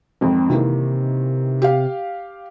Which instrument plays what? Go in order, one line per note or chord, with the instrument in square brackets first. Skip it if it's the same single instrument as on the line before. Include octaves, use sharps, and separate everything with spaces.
[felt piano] G#1 F2 [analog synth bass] C4
[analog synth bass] C3 [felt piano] D#3 E3 A#3
[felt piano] G4 F5